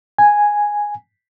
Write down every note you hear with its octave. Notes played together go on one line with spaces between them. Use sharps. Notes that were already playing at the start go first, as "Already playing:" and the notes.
G#5